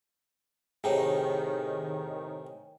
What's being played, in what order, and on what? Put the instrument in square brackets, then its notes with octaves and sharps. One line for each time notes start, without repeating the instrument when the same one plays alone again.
[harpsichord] A2 C3 D#4 [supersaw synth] D#3 [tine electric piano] G#4 [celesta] C#5 G5 G#5